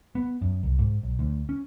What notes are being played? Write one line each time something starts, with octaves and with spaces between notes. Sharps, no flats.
B3
F#2
C2
G#2
B1
D2
C#4